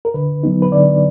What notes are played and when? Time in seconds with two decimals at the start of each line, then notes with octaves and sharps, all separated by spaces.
0.05 A#4
0.14 D3 B4
0.43 F#3 B3 D#4
0.62 B4
0.72 D3 D5